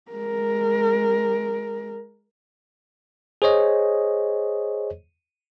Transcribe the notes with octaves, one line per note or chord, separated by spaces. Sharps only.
G#3 A#4
G#4 C5 C#5 D#5